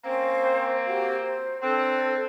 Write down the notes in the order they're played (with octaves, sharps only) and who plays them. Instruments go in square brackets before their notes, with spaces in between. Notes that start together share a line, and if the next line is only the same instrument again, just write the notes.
[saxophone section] A#3 C4 [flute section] C#4 C5 G5
[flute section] F#4 G4 F5
C5
[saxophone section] C4 [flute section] D4 A4 F#6